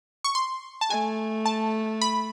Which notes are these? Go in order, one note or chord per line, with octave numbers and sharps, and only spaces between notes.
C#6
C6
A5
A3 G#5
A5
B5